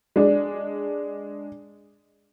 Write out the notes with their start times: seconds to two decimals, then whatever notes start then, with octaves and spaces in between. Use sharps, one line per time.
0.16 G#3 D4